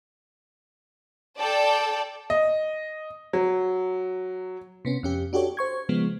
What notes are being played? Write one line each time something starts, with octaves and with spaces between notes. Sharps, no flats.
A4 D5 G5 A5
D#5
F#3
C3 B3 C#4
F2 C#4 G4
D4 F#4 G4 A4 C#5
C5 C#6 G#6
C#3 F3 G#3 B3